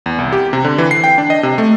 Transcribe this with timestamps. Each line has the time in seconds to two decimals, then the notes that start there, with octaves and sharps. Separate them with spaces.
0.06 E2
0.19 C2
0.33 G4
0.53 C3
0.65 D3
0.78 E3
0.91 C7
1.04 G5
1.18 D4
1.30 D#5
1.43 C3
1.58 A3